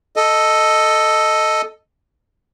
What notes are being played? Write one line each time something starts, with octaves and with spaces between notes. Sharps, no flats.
A4 D#5